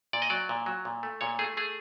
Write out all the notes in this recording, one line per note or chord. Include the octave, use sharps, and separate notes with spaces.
A#2 D5
D#5
F#3 D5
A#2
F#3
A#2
A3
A#2 C#5
A3 G#4
A3 G#4